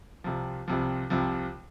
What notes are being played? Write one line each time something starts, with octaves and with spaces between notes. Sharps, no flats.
C2 C3 F3
C2 C3 F3
C2 C3 F3